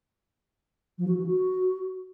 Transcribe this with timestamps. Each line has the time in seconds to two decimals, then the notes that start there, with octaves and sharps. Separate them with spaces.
0.98 F3
1.07 F#4
1.17 E3
1.26 F#4